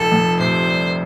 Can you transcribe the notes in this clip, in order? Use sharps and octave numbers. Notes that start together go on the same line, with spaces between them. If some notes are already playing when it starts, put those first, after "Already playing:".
Already playing: F1 A4
F2
C3 C5
G3